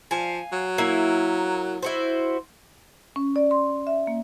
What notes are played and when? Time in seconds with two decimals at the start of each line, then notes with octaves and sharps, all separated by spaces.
0.11 F3 F5 G#5
0.52 F#3
0.78 A#3 E4
1.82 E4 F#4 C5
3.16 C#4
3.36 D5
3.51 C6
3.87 E5
4.07 A#3